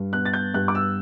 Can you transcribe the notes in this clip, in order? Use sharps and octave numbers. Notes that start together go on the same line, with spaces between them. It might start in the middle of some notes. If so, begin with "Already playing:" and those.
Already playing: G2
B3 F#6
A6
G6
G2 F#6
D6
E6